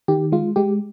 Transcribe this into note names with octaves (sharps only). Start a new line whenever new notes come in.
D#3 G4
G#3 F4
G#3 G4